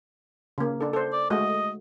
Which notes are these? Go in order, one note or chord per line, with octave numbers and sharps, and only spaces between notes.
C#3 A#3
D4 A4
A4 C5
D5
G#3 A3 F#4 D#5